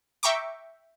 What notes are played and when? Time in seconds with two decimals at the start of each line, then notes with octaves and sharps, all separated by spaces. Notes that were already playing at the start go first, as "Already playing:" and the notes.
0.23 E5 G5 A#5 C#6 D6